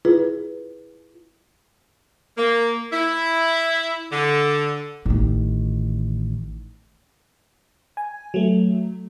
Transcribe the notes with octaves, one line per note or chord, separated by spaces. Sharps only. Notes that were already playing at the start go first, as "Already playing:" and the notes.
E4 F4 G#4 B4
A#3
E4
D3
A1 D#3
G#5
F#3 A3